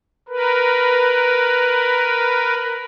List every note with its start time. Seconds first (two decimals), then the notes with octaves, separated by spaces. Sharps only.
0.28 A#4 B4